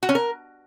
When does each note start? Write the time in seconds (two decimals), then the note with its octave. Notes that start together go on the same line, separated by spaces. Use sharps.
0.03 F#4
0.09 C#4
0.15 A#4